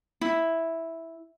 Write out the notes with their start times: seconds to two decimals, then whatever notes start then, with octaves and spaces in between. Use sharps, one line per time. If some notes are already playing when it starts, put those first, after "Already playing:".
0.21 E4